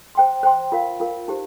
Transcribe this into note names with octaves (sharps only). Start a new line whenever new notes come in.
C5 G5 C6
C5 G5 C6
F4 A#4 F5
F4 A#4 F5
D#4 G4 C5